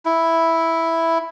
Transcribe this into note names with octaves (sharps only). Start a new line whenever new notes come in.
E4